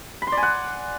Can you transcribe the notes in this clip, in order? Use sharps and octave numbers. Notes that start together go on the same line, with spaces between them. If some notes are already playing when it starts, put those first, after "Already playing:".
B5
C6
D5
G#5
F#5